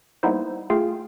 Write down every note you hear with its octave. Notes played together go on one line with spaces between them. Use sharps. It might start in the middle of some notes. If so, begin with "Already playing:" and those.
G3 A#3 B3 D#4 E4 C5
A3 F4 G#4 F5 G5